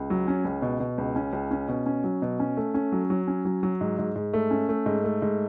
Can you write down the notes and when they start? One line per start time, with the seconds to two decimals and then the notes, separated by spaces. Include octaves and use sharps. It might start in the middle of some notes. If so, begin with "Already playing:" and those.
Already playing: C#2
0.10 F#3
0.28 C#4
0.45 C#2
0.62 B2
0.80 B2
0.98 C#2
1.16 C#4
1.33 C#2
1.51 C#4
1.69 B2
1.86 C#4
2.04 F#3
2.22 B2
2.40 C#4
2.57 A3
2.74 C#4
2.92 F#3
3.10 F#3
3.28 C#4
3.45 F#3
3.63 F#3
3.81 G#2
3.98 G#2
4.16 G#2
4.33 A3
4.51 C#4
4.69 A3
4.86 G#2
5.04 A3
5.22 G#2